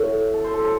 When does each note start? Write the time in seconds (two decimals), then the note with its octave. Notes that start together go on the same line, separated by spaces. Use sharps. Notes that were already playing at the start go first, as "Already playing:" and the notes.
Already playing: A2 F#3 A3 F#4
0.34 A4
0.44 C5
0.54 A4
0.64 A4